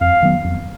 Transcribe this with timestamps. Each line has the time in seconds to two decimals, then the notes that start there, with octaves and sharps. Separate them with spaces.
0.01 F2 F5
0.22 D#3 F#3 B3
0.44 F2